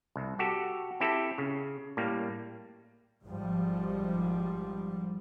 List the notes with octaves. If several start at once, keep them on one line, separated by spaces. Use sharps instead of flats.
C2
F#4 G4 A4
C4 E4 G4 A4
C#3
A2 G3 A#3
G#1 G#2 F3 G3